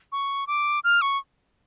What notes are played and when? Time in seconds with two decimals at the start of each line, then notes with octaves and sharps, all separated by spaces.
0.12 C#6
0.47 D6
0.84 F6
1.02 C#6